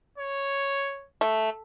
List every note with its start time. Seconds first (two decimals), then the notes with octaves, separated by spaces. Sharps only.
0.18 C#5
1.21 A3